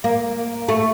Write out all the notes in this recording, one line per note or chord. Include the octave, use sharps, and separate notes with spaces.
A#3
A3